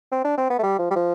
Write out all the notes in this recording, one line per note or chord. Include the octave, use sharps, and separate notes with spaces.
C4
D4
C4
B3
A3
G3
F3
G3
F3